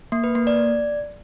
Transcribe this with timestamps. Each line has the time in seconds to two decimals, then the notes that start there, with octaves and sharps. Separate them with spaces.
0.12 A#3
0.24 B4
0.35 A#3
0.47 D5